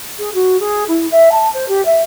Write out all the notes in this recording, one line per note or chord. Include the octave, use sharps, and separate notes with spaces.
G#4
F#4
G#4
E4
E5
A5
C5
G4
E5